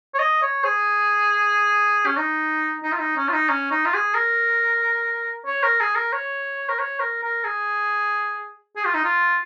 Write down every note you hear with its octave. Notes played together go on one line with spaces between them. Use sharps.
C#5
D#5
C#5
G#4
C#4
D#4
D#4
F4
D#4
C#4
F4
D#4
C#4
D#4
F4
G#4
A#4
C#5
A#4
G#4
A#4
C#5
A#4
C#5
A#4
A#4
G#4
G#4
F4
D#4
F4